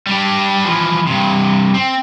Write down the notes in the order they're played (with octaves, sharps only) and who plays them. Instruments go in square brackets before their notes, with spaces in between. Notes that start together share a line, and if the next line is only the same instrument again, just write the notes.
[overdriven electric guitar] G3 D4
E3 F3
G2 C3
C4